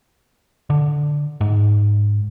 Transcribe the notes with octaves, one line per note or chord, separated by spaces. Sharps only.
D3
G#2